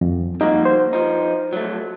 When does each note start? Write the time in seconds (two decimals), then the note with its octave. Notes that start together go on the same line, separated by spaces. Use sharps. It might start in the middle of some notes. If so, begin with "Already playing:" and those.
0.01 F2
0.41 G3 A#3 D#4 F#4
0.65 C5
0.93 F3 D#4
1.53 F#3 A3